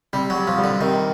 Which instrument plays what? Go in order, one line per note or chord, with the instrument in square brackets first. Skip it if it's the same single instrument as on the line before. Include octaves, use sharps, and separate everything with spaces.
[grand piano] C3 [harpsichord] G3
[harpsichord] F#3
[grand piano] G3
[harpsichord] F3
[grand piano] G3
[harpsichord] D3
[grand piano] C3 [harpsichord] D#3